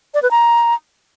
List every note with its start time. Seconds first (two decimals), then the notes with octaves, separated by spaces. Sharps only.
0.14 D5
0.23 B4
0.31 A#5